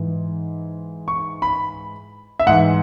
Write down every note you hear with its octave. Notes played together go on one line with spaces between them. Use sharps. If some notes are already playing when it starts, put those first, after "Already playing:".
Already playing: G#2 E3
C#6
B5
E5
G#2 E3 F#5